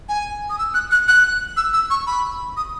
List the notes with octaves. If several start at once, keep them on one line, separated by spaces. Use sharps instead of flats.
G#5
D#6
E6
F#6
F#6
F#6
E6
E6
C#6
B5
D#6